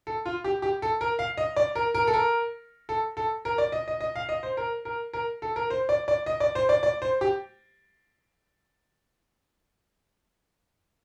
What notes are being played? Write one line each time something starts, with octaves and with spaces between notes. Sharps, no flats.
A4
F4
G4
G4
A4
A#4
F5
D#5
D5
A#4
A#4
A4
A#4
A4
A4
A#4
D5
D#5
D#5
D#5
F5
D#5
C5
A#4
A#4
A#4
A4
A#4
C5
D5
D5
D#5
D5
C5
D5
D5
C5
G4